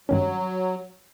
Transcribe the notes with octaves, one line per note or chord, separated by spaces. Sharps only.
G2 D#3 F#3 C#4